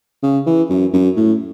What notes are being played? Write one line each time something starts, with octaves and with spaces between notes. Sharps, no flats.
C#3
E3
F#2
F#2
A2